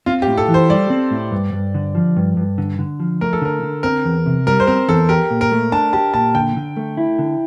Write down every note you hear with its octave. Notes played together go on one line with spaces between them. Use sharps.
C4 F4
G4
A2
A4
E3
C5
G3 D5
C4
A2
G2
G2
D3
F3
G2
G2
D3
D3
F3
A3 A#4
A4
D3 A#4
D3
C4 A#4
E2
C3
G3 A#4
C5
C4 A#4
E2 A4
G4 A#4
A#2
A#4
A3
D4 A5
G4 A5
A#2 A5
D3 G5
D3
A3
E4
D3